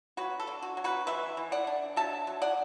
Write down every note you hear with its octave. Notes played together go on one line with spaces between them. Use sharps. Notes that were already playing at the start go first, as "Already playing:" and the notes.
F#3 F#4 B4
A4
D4
F#4
F#3
F#4 B4
E3 B4 E5
E3
D5 F#5
D4
F#3 E5 A5
F#3
D5 F#5